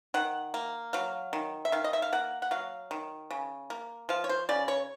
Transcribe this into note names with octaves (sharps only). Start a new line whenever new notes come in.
D#3 F#5
A#3
F#3 F5
D#3
E5
D#3 F5
D#5
E5
F5
A#3 F#5
F#5
F#3 F5
D#3
C#3
A#3
F3 F5
C#5
C5
C#3 D5
C#5